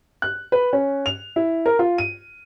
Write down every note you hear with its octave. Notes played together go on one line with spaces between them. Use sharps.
F#6
B4
C#4
F7
E4
A#4
F4
D#7